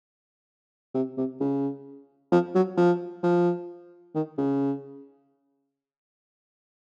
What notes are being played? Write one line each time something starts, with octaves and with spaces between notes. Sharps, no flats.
C3
C3
C#3
F3
F#3
F3
F3
D#3
C#3